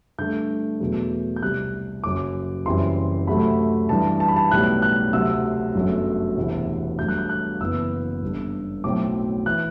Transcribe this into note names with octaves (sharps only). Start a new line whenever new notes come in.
G2 D3 A3 G6
E2 B2 F#3 A3
G6
C2 C3 G3 F#6
F#1 F#2 F#3 D6
F#1 F#2 E3 G3 C4 C6
D2 C3 F#3 A3 B5
G2 E3 G3 A5
A5
B5
A5
B1 A2 G3 B3 F#6
F#6
D2 C3 F#3 E6
G1 F#2 F#3 A3
E1 D2 C3 E3
G2 F#3 A3 G6
F#6
G6
F#6
F#1 F#2 E3 B3 E6
G1 G2 D3
B1 A2 F#3 C4 D6
E3 F#6